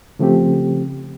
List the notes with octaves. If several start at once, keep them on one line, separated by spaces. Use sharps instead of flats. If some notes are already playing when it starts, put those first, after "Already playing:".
C#3 F3 A3 C4 G4